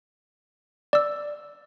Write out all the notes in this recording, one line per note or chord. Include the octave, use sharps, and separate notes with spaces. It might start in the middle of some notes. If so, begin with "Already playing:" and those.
D5 E6